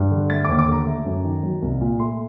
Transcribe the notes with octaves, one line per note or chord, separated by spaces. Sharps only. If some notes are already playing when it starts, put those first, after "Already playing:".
Already playing: G2
D3
A3 A6
D#2 D6
D6
D3 A#5
A3
F#2
D#3
F#3
C2
A#2
A3 C6